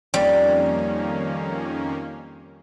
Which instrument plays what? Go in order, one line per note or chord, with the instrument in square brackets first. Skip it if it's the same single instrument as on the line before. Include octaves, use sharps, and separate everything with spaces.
[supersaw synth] F2 D#3 A#3 C#4 [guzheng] G3